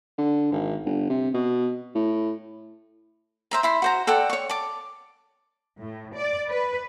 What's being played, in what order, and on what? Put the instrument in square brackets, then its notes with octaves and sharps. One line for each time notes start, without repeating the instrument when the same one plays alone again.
[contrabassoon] D3
G#1
G1
C3
B2
A2
[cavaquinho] C5 E5 A#5
E4 B5 C6
F#4 C5 A#5
A4 D5 F#5 G5
C#5 C#6
A5 D6
[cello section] A2
D5
B4